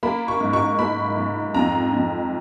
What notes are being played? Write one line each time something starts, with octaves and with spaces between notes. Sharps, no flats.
A#3 B5
C#6
G#2
C#6
A#3 B5
G#2
F2 A#5
F2